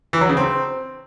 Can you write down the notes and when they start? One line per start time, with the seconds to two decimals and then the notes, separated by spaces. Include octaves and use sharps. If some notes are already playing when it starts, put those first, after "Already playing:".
0.13 E3
0.21 F#3
0.29 C#3
0.37 C4